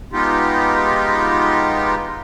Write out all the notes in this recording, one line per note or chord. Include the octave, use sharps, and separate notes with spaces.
G#3 B3 D#4 F4 G4